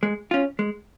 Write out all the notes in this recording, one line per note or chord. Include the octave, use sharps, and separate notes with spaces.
G#3
C#4 F4
G#3